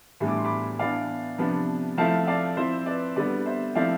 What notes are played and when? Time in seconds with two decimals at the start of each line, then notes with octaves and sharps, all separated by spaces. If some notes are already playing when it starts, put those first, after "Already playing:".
0.20 A2 E3 G3 B3 D4
0.28 D6
0.37 C6
0.44 B5 D6
0.79 E3 B3 D4 D5 F5
1.38 C3 F3 B3 D4
1.98 F3 A3 C4 E4 F5 A5
2.27 D5 F5
2.57 F3 C4 E4 C5 E5
2.86 B4 D5
3.16 D3 G3 B3 B4 D5
3.46 C5 E5
3.75 F3 A3 C4 E4 D5 F5